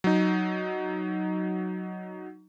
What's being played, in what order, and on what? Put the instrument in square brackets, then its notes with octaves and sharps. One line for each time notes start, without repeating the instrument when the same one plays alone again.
[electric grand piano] F#3 D#4